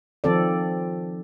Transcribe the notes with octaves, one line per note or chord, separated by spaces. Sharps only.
D#3 F3 C4 A4 D5